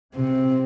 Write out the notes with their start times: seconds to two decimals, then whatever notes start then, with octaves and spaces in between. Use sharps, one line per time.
0.15 C3 C4